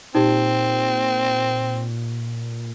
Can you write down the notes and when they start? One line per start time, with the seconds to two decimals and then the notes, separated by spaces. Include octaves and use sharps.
0.15 A#2 C4 D#4 G4